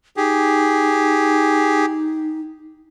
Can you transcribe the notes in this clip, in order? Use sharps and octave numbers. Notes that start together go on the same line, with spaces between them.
D#4 G4 G#4